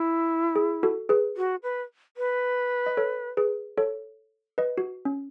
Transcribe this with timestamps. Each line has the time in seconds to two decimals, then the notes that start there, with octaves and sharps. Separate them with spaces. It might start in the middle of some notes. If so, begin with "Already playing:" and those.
Already playing: E4
0.56 G#4
0.83 F#4 A4
1.09 G#4 B4
1.37 F#4
1.63 B4
2.17 B4
2.86 D#5
2.97 A4 C#5
3.37 G#4 B4
3.78 A4 C#5
4.58 B4 D#5
4.78 F#4
5.05 C#4